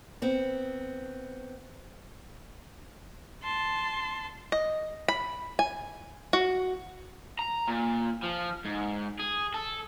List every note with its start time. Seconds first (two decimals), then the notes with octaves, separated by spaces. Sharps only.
0.22 B3 C4
3.43 A5 C6
4.52 D#5
5.08 B5
5.59 G#5
6.33 F#4
7.39 A#5
7.68 A#2
8.24 F3
8.65 G#2
9.19 G#4
9.54 A4